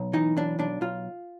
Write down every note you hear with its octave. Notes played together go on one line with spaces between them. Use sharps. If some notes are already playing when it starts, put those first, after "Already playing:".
Already playing: B1
E3 D#4
B1 D4
B1 D4
B1 F4